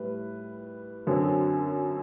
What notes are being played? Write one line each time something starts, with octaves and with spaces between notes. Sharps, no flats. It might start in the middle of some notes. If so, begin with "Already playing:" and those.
Already playing: A2 G3 B4
F#2 D3 F#3 C4